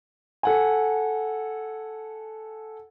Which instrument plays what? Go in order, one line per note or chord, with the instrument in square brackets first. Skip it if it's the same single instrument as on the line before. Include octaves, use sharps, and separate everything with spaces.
[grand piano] A4 F#5 G#5